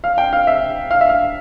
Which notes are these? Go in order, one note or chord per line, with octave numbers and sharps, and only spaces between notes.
F5
G5
F5
E5
F5
E5
F5